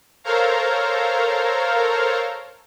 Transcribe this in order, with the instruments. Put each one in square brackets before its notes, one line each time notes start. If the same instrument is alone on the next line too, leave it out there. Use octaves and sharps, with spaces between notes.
[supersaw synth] A4 A#4 C5 C#5 F5 A#5